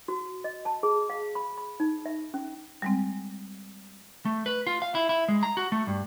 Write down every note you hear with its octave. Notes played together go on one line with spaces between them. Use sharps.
F#4
D#5
A5
G#4
F5
B5
B5
D#4
E5
C#4
G3 G#3 C4
A3
B4
F4
F5
E4
E4
G#3
A#5
F#4
A3
G2